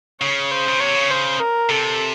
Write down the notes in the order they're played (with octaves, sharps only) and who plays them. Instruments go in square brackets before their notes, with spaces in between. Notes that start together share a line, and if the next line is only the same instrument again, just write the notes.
[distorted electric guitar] C#3 [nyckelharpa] C#5
[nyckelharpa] C5
[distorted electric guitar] C#3
[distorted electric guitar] C3 [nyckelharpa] C#5
[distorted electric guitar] C#3
[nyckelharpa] C5
A#4
[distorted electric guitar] C3 [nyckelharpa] A4